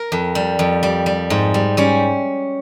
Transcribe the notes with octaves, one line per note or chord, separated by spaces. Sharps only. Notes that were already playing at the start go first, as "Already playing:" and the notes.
Already playing: A#4
F2
G3
F2
G3
G3
G#2
G3
G3 C#4